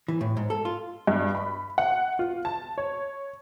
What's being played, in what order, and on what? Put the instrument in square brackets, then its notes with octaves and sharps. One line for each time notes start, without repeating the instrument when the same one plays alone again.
[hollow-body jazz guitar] E3
A2
G#2
A4
F4
[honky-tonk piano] G2
B5
F#5
F4
A5
C#5